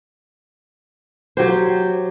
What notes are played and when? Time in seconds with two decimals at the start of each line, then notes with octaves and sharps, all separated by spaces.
1.37 F#3 G4 C5